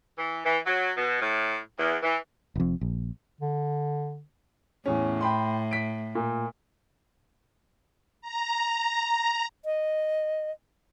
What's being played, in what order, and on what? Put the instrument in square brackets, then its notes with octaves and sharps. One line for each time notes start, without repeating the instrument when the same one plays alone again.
[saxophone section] E3
E3
F#3
B2
A2
E2
E3
[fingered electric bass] F1 F2
A#1
[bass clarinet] D3
[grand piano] E2 C#4 [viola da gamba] A2
[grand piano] G5 B5 C6
B6 D7
A#2
[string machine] A#5
[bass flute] D#5